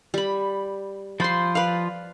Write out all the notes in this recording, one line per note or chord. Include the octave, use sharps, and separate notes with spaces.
G3 B5
F3 F4 C5 B5 C6
B4 D5 F5